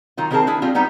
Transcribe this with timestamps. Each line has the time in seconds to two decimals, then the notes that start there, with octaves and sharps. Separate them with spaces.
0.17 D#3 F#3 F4
0.31 D#3 B3 C4 G#4 A#4 A5
0.47 D4 E4 G#4
0.62 G3 C4 D4 F4
0.75 G3 B3 D#4 G4